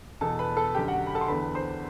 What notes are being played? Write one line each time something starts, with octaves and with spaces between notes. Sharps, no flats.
E2 B2 A4 A5
B4 B5
A4 A5
F#2 D3 G4 G5
F#4 F#5
B5
A4 A5
C6
E2 D3 B4 B5
C5 C6